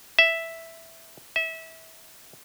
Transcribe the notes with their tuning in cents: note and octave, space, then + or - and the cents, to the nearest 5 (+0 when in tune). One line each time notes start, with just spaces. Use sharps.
E5 +0
E5 -25